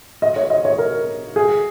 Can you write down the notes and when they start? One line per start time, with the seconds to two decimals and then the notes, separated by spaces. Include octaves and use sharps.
0.22 D#5
0.36 C#5
0.50 D#5
0.65 C#5
0.78 A#4
1.36 G#4